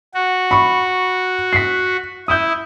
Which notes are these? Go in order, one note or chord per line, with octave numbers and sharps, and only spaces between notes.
F#4
B5 C#6
B6 C7
E4 D#6 G6